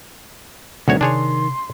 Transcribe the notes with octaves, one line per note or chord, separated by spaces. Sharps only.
D2 B2 D#3 G3 C4 F#4 C#5
C3 D4 G#4 C#5 C6